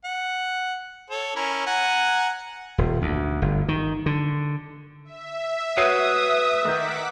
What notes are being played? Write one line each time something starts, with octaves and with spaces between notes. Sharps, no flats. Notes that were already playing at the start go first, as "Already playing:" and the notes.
F#5
A4 C#5
C#4 E4 A#4
F#5 G#5 A#5
D#1
D2
G1
D#3
D3
E5
F#4 B4 C#5 D#6 C7
D#3 F#5 D6 D#6 G6 B6